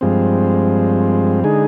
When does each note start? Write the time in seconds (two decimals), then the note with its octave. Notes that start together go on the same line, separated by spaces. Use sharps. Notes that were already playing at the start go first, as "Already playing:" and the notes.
0.01 G2 F3 G#3 C4
1.44 D3 G#3 D#4 G#4